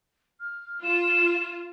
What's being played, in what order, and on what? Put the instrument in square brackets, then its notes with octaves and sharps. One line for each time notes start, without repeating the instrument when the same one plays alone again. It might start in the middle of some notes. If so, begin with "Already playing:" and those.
[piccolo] F6
[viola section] F4 [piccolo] E7